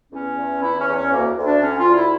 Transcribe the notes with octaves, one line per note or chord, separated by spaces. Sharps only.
E2 C#4
E2
E3 E4
C#4
E2
C#4
D2 A#3
D2
D4
D3 C#4
F4
D2
E4